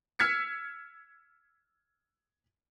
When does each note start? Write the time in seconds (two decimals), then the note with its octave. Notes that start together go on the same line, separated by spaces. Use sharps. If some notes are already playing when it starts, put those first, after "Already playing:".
0.19 E6 F6 G#6 B6 C#7